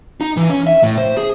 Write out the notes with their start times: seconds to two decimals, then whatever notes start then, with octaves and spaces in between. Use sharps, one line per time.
0.21 D#4
0.37 E3
0.50 C#4
0.67 E5
0.83 A2
0.98 C5
1.17 G#4